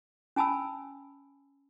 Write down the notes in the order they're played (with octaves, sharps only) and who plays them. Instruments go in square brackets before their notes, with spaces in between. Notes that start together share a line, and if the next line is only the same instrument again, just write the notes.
[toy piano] C#4 G#5 A5 B5 E6